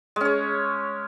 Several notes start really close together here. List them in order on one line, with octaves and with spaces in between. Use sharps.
G#3 C#4 C#5